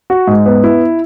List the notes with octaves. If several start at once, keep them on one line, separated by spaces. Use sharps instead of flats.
F#4
G#2
B3
E4